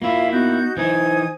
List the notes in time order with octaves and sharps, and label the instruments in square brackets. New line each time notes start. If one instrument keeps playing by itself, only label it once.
[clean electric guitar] A#3 E4 [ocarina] F4 [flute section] E5 F5 B5
[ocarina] B3 [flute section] D#4 F#4 G6
[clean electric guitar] E3 D#4 [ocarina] C5 [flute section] G#5 D#6 G#6